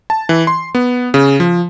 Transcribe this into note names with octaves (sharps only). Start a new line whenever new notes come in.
A5
E3
C6
B3
C#3
F3